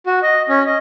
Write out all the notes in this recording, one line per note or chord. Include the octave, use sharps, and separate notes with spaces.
F#4
D#5
C#4
D#5